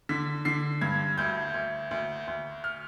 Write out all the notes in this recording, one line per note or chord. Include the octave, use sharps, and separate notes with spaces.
D3 B6
D3 C7
G2 G#6
D2 G6
D2
D2
D2
F6